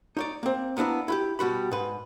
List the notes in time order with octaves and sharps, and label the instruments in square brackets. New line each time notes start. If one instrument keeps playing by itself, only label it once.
[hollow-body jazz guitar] D#4 C#5 D5
A#3 C4
A#3 B3 D4 E4 A#5
E4 F#4 G4
B2 G3 F#4 B5
G#2 B4